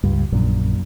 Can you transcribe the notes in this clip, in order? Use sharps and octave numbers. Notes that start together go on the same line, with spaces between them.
C#2 G2
A#1 F#2 A#2